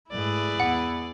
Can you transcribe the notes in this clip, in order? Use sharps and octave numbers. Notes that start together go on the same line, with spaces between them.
G#2 G#3 A3 E4 G#4 B4 D5
E2 B3 F#5